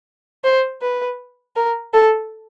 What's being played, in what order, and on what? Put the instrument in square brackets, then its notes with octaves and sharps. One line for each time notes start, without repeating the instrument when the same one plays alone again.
[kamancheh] C5
B4
A#4
A4